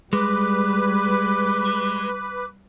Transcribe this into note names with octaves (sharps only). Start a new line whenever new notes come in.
G3 G#3 B4 D6